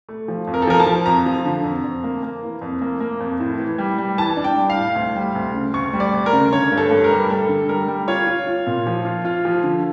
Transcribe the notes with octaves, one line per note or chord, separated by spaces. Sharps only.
A3
F3
F2
A#4
A4
F3 A#4
A5
F3
F2 A#5
F3
D3
F2
F2
A#3
A#3
E3
F2
A#3
A#3
F2
A2
E3
G3
G3
E3 A5
D4
G5
G3
F5
A2
D2
G3
D2
C#3
D2 C#6
G3
D5
D2
A#4
C#3
D3 C#5
G2
A4
G2
A#4
G3
G3 A4
D3
G3 A#4
G3
F4 C#5
F4
F4
A#2
F3
F4
F4
F3
D3